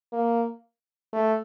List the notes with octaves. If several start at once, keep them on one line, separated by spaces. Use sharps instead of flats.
A#3
A3